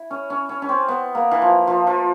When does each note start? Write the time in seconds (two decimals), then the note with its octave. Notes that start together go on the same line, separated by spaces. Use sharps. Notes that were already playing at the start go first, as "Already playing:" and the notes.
Already playing: E4
0.11 C#4
0.30 C#4
0.49 C#4
0.62 C#4
0.69 C4
0.88 B3
1.15 A#3
1.31 E3
1.42 F3
1.67 F3
1.87 F3